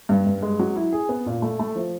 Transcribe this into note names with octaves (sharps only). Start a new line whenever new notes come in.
G2
G2
G#3
F#3
E4
G#4
B3
A#2
A3
A3
F3